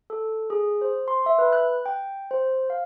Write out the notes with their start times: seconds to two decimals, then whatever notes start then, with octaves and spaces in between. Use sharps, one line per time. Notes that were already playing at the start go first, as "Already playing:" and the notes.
0.10 A4
0.50 G#4
0.81 C5
1.08 C6
1.26 E5
1.39 B4
1.53 F#6
1.86 G5
2.31 C5
2.70 F5